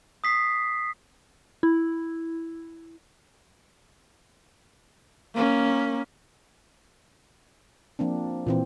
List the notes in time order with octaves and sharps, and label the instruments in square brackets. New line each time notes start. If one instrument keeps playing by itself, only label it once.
[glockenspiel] D#6 B6 C7
[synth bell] E4
[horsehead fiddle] A#3 C#4
[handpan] F3 A#3 C4 D4
A#2 E3 C4